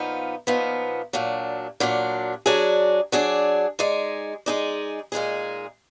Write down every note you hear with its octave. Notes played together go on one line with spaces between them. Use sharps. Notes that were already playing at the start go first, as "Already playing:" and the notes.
Already playing: A#2 F3 B3 D#4
A#2 F3 B3 D#4
A#2 F#3 D4
A#2 F#3 D4
F#3 D4 G#4 D5
F#3 D4 G#4 D5
G#3 D#4 G#4 D5
G#3 D#4 G#4 D5
A#2 G#3 D#4 G#4